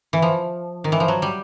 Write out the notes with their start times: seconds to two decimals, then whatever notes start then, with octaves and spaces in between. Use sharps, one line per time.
0.13 E3
0.22 F3
0.84 D#3
0.92 E3
1.00 F3
1.08 F#3
1.22 G3